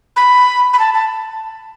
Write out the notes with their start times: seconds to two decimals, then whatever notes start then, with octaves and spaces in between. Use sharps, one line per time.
0.16 B5
0.73 B5
0.79 A5
0.94 A5